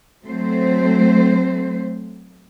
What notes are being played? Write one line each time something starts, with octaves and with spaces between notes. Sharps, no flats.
F#3 A3 C4 C5